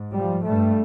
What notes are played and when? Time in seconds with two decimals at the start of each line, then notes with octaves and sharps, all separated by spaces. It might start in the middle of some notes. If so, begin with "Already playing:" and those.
Already playing: G#2
0.17 F3 G3
0.47 G2 G3 A3